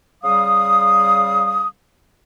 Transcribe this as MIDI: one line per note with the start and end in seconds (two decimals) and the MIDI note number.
0.23 1.68 49
0.23 1.68 55
0.23 1.68 77
0.23 1.68 87